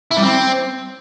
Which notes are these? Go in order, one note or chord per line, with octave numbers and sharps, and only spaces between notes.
E4
G3
C4